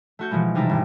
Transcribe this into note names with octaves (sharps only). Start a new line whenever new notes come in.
A3 F#4 G6
B2 E3 F3 G#3 B3
C3 G3 D#4 E4 A4
G#1